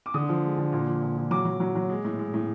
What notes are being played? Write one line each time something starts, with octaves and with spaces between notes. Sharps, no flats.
D6
D3 D#6
F3
G#3
D3
A#2
F3
A#2
A#2
F#3 D6
F#3
F#3
F#3
G#3
A2
G#3
A2